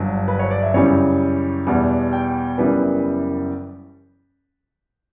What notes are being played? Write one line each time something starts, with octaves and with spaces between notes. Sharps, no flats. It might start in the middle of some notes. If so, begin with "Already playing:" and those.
Already playing: G1 G2 F#3
B4
C#5
D5
E5
F#2 C#3 E3 G3 C#5
E2 B2 G3 B3
G5
F#1 F#2 E3 G3 B3 B4